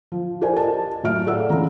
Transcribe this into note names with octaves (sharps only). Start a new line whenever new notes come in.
F3
G4 A4 A#4 C5 D5 G#5
D#5 A5
A2 F#3 E5 F6 D7
G#4 A4 D5 F5 F#5 E6
C3 E3 G#3 C#4 A#5